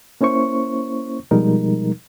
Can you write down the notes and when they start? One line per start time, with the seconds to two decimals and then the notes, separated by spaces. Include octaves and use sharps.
0.21 A#3 C#4 E4 C5 C#6
1.31 B2 F3 G3 G#3 D#4 A#4